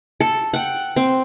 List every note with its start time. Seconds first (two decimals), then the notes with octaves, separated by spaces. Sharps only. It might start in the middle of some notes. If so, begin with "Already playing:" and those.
0.20 A4
0.53 F#5 G5
0.96 C4